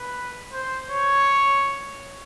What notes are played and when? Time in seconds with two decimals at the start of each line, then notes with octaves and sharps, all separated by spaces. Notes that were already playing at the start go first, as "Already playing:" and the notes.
Already playing: B4
0.52 C5
0.90 C#5